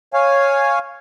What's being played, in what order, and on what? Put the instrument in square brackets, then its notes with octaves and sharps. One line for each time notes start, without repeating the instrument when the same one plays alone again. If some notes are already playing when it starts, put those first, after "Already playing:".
[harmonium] C#5 F5 G#5